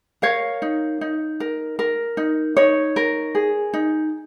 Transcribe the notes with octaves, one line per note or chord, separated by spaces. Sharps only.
A#4 C#5 F5
D#4
D#4
A#4
A#4
D#4
D#4 C#5
A#4
G#4
D#4